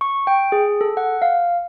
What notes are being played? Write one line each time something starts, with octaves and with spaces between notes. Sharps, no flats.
C#6
G5
G#4
A4
F#5
F5